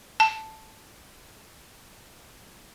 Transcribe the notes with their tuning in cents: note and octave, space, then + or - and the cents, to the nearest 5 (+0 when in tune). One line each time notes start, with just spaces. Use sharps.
A5 -5